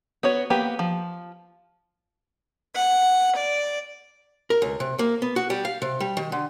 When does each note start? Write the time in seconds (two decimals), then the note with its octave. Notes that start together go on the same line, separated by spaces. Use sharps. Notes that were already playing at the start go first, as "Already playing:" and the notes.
0.23 B3 F#4 C#5
0.50 A#3 B3 G4 B4
0.79 F3
2.75 F#5
3.37 D5
4.50 A#4
4.62 C#2
4.80 C3
4.99 A#3
5.22 B3
5.36 F#4
5.50 G3
5.65 F5
5.82 C3
6.00 G3
6.17 D#3
6.32 D3